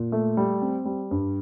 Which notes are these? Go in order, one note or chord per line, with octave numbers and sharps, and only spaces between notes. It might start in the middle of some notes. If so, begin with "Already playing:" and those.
Already playing: A#2
A3
G3
C4
G3
G2